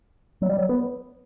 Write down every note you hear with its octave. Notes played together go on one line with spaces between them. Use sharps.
F#3
G3
F#3
B3